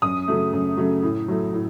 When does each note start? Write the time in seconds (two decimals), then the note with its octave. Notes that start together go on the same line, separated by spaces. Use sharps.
0.02 F#2 D#6
0.28 C#3 F#3 A3
0.53 F#2
0.77 C#3 F#3 A3
1.03 A2
1.28 F#3 A3
1.53 A2